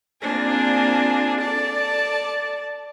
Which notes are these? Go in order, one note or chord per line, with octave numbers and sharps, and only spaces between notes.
A#3 C4 D4 F4 G#4
A4 D5 A5